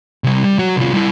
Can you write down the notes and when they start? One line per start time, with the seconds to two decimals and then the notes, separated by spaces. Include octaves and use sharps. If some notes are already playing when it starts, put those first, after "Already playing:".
0.24 C3 G3
0.44 G3
0.59 F#3 F#4
0.77 C2 F4
0.93 G3 E4